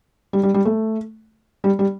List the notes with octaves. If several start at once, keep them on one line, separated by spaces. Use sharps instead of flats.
G3
G3
G3
A3
G3
G3